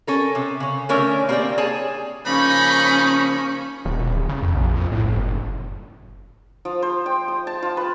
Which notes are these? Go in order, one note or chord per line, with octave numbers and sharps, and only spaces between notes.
C#4 A4 A#4
C3
C#3 C#4
D3 A3 C#4 A#4 C#5
A#3 C4 G4 A#4 D5 G5
G#4 C#5 G#5 A5
C#3 F3 A#3 C#4 D#4 B5 C#6
D#1
E1
D1
C#3
F2
A#1
F2
A2
G1
F#1
F3
C5
G5
D#6
A5
F4
B4